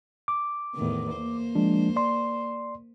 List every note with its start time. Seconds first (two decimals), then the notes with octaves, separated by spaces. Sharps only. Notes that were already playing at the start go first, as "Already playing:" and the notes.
0.28 D6
0.75 E2 A2 D#3
1.13 A#3 C5
1.55 F3 G#3 D4
1.96 D5 C6